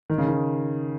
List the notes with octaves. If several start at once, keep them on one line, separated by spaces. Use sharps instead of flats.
D#3
C#3
D#3